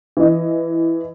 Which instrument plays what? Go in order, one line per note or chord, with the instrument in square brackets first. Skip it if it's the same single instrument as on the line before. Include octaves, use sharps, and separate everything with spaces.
[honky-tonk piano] E3 D#5